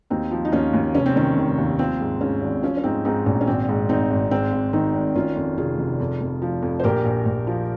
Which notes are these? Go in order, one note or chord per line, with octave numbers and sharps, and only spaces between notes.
D#2 C4 D#4
F3
D#4
D#2 C#4 F4
D#2
F1 C#4
C4
D#3 C#4
F1
D#2
F3 C4
G#2
G#2 C#4
G#1
F3 C#4
C#4
G#2 C4 D#4
G#2 C4 D#4
A#1 C#4
C#4
G#1 C4
G#2
G#1 C4 D#4
G#1
G#2 C4
G#2
D#3 C4 D#4
G#1
D#3 C#4 F4
F2
F1 F4 G#4
F1
F2
F2
F3
F2
C5
A#1 G4 A#4
A#1
A#1
F3